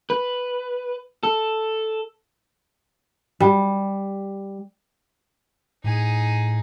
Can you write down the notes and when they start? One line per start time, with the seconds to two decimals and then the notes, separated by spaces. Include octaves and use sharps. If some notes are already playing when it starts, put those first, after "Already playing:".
0.10 B4
1.23 A4
3.40 G3
5.84 A2 D#4 G#4